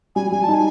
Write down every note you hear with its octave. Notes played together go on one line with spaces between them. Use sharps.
G3 G#5
G3 G#5
A5
D#4
G#5